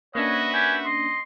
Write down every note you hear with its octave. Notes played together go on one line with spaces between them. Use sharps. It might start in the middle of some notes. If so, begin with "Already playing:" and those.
A#3 C#4 D4 F#4 B4 C#5 D#5 E5
G4 G#5
D#5 C6